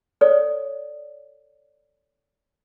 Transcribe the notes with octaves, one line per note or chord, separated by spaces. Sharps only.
A4 C#5 D5